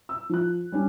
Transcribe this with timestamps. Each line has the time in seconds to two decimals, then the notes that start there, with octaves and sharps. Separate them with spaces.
0.09 E6
0.29 F3 F#6
0.72 G3 C#4 D4